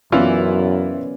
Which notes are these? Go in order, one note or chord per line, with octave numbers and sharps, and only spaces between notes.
F#2 E3 B3 C#4 E4 F4 D5